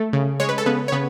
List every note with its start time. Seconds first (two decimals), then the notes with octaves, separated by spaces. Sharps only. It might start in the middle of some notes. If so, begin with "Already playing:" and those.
Already playing: A3 A4
0.13 C#3
0.40 G#3 C#5
0.49 B4
0.58 A4
0.66 C#3 B3 B4
0.88 C#5
0.92 C#3 B3 B4